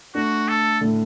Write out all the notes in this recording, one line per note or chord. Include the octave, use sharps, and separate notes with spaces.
A3 D4 F#4
A4
A2 D3